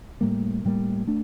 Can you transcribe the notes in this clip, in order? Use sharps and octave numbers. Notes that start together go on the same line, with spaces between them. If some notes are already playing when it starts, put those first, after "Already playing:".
A2 G3 A#3
A2 G3 A#3
A3 D4